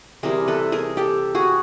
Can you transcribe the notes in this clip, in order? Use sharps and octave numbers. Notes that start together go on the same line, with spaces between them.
C3 E3 G3 G#4 A#4
A4 B4
G#4 A#4
G4 A4
F#4 G#4